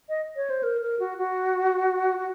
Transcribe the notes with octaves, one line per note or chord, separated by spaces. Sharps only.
D#5
C#5
C5
A#4
A#4
F#4
F#4
F#4